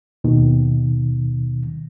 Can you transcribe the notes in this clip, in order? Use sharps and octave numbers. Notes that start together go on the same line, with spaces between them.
D#2 B2 D#3